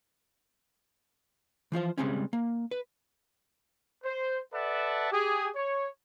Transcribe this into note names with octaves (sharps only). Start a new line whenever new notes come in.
E3 F3 F4 C5
C#3 E3 G3 G#3 C4 C#4
A#3
B4
C5
A4 B4 D5 E5 F#5 A5
G4 G#4
C#5